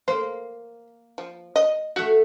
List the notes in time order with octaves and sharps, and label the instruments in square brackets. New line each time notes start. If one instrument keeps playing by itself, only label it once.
[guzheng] A#3 [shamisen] C5
[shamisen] F3
D#5
[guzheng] A3 E5 [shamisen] F#4